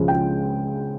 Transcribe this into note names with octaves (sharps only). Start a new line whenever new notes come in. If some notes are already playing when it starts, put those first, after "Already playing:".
Already playing: C#2 C#3 F3
G5